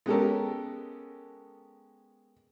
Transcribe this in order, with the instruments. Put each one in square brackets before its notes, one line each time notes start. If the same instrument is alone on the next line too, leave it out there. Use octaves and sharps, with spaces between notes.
[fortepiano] G#3 B3 C#4 G4 A4 A#4